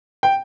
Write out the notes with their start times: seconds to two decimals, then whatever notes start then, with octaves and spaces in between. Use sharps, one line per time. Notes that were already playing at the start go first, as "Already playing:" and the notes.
0.23 G5